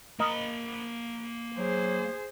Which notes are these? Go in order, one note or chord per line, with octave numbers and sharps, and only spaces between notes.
A#3 A#4 D#5 B5
F#3 G#4 C5